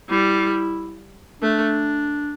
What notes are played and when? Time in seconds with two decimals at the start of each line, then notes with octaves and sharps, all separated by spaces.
0.10 G3 E4
1.42 A3 D4